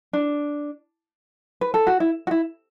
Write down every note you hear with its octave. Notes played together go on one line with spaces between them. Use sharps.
D4
B4
A4
F#4
E4
F#4
E4